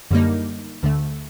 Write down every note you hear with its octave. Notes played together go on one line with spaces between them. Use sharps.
F#2 D3 G3 A#3 D#4
D2 D3 A3